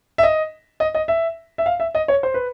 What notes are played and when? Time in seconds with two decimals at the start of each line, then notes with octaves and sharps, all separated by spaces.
0.18 E5
0.23 D#5
0.80 D#5
0.95 D#5
1.08 E5
1.58 E5
1.66 F5
1.80 E5
1.95 D#5
2.08 C#5
2.23 C5
2.34 B4